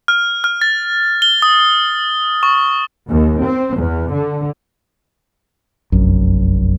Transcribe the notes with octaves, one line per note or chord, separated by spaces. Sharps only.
F6
F6
A6
G7
D#6
C#6
D#2
C4
E2
D3
F1 A#1 F#2